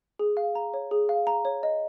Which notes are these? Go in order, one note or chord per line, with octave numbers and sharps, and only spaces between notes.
G#4
F5
A#5
C#5
G#4
F5
A#5
C#5
D#5